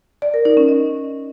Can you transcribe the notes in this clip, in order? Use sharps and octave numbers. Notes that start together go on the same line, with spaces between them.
D5
A#4
D#4
C#4
D#5